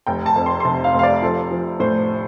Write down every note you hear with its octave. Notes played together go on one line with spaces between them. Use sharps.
F1 G5
A5
F2
C6
C6
C3 A5
F5
F1
F5
D5
F3 A4
F3
A2 C5